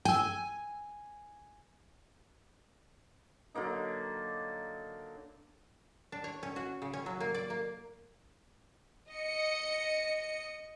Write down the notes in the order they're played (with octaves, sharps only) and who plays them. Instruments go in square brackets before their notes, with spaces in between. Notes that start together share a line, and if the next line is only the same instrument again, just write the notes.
[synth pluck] G5 E6 [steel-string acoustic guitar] G#5
[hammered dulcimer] D3 F#3 A#3 D#4
[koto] D4
C#5
C#4
F#4
C#3
C#4
F#3
A#3
D5
A#3
[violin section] D#5 C#7